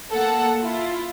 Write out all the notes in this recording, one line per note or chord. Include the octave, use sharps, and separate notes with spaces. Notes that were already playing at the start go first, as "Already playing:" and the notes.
A#3 A4 F#5
E4 F4